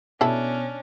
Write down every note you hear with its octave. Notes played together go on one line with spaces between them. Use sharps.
B2 C#4 D4 E4 A4